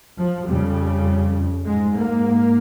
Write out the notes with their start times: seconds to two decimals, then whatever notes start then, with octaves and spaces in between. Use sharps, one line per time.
0.17 F3
0.46 F2 C#3 G3
1.64 G#2 G#3
1.94 A#3